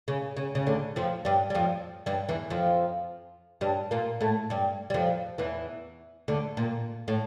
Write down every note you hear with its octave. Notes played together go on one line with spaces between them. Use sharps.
C#3
C#3
C#3
D2 D3
F2 F3
G2 G3
G3
F2 F3
G2 G3
E2 E3
F2 F3
G2 G3
A#2 A#3
A2 A3
G2 G3
G3
F2 F3
E2 E3
D2 D3
A#2
A2